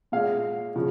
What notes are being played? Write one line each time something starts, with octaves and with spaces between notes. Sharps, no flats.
A#2 G#3 F5
C#3 F3